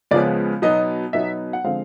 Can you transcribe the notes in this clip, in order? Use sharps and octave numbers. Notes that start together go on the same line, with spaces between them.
C#2 C#3 F3 G#3 B3 D5
B2 F#3 B3 D#4 D#5
B2 F#3 B3 D#4 E5
F#5
D3 F3 G#3 C4 F5